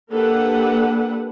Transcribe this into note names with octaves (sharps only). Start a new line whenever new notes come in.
A#3 D4 G4 A4 B4 F#5